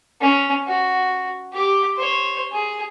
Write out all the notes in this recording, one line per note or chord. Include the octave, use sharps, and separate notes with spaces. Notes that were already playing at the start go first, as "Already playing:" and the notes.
C#4
F#4
G4 D6
C5 C#5
G#4